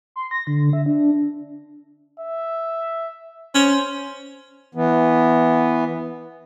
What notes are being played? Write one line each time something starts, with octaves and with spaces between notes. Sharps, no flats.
C6
A#6
D3
E5
D4
E5
C#4 C5
E3 B3